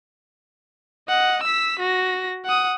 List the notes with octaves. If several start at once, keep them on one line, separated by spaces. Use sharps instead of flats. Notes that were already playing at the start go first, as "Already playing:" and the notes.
D#5 F#5
E6 B6
F#4 A#6
F#5 D#6